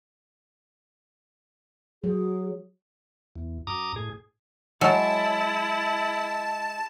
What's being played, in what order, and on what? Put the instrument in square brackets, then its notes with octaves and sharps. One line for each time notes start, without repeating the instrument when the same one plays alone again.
[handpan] F#3 [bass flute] G#4
[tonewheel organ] E2
F#2 A#5 D6 D#6
A2 G#4
[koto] F#3 [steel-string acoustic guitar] G#3 [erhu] E4 [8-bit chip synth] A5